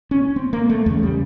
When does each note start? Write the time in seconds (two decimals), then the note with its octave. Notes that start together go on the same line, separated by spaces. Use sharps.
0.11 C#4
0.36 C4
0.53 A#3
0.69 A3
0.86 E2 A3
0.90 C#3
1.03 G3